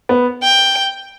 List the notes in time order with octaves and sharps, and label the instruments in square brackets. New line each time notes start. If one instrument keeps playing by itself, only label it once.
[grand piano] B3
[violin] G5